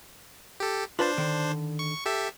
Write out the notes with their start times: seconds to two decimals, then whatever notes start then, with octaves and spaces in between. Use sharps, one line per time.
0.60 G4 A4
0.99 D4 F4 B4 C5 A5
1.18 D3 D#3
1.79 C#6
2.06 G4 A4 E5